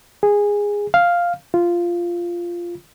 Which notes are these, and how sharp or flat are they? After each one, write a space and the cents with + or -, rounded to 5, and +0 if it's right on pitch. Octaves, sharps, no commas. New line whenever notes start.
G#4 -15
F5 +0
F4 -10